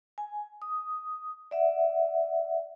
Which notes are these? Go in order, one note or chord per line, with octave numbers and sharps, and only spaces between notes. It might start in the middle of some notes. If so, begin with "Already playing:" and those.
G#5
D#6
D5 E5 F#5